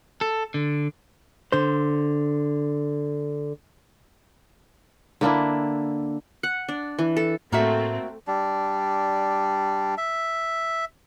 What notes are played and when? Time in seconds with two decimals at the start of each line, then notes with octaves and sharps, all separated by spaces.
0.21 A4
0.54 D3
1.52 D3 C5
5.21 D3 A#3 D4 E4
6.43 F#5
6.69 D4
6.99 E3
7.17 A4
7.52 A2 A3 A#3 C4 F#4 E5
8.27 G3 D4
9.98 E5